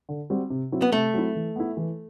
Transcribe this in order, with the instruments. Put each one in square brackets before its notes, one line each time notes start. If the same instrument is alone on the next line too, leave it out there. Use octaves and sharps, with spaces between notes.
[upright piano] D3
G3 C4 F#4
C3
F#3 C4 E4
[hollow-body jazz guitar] B3
[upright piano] C3 [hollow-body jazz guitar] A3
[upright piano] F#3 C4 E4
E3
B3 E4
E3